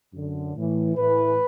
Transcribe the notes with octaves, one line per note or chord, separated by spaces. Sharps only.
F#2 D3
A2 E3
A2 E3 B4